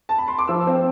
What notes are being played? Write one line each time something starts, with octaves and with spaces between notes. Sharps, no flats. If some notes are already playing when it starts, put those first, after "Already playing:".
A5
B5
C6
D6
F3 E6
C4